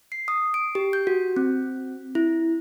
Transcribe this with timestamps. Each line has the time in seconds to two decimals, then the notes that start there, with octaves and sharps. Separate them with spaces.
0.12 C7
0.28 D#6
0.54 D7
0.75 G4
0.93 G6
1.07 F#4
1.36 C4
2.15 E4